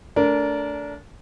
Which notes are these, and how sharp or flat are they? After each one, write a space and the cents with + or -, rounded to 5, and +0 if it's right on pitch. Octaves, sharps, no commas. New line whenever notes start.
A3 +0 D4 -25 A#4 +0